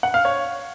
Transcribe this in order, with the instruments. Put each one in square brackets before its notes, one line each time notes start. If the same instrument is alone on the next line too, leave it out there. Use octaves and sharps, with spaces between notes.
[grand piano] F#5
F5
C#5